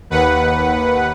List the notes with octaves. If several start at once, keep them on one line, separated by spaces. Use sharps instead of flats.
D#2 B4 F#5